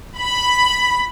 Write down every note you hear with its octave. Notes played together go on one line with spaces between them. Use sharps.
B5